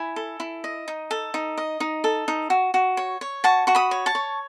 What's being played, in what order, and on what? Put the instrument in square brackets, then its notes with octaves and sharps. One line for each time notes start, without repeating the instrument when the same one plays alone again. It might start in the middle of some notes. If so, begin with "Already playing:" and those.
Already playing: [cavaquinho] E4 G#5 B5
A4
E4
D#5
D#4
A4
D#4
D#5
D#4
A4
D#4
F#4
F#4
C#5
C#5
F#4 A5 C#6
F#4 C#6
B5 D#6
C#5
A5 C#6
C#5